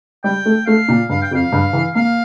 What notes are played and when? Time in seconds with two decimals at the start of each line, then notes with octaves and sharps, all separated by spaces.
0.24 G3 G5
0.46 A3
0.66 A3 F5
0.88 A#2
1.09 G2 F5
1.22 G5
1.31 F2
1.35 F5
1.52 G2
1.73 E3
1.95 A#3 F5